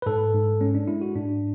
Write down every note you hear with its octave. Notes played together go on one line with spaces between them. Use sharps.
B4
G#2 A4
G#2
G#3 C#4
D4
G#3 E4
F#4
G#2 D4